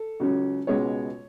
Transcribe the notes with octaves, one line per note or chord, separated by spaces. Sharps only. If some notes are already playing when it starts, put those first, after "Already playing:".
Already playing: A4
C#2 C#3 F#3 C#4
C#2 B2 G#3 B3 C#5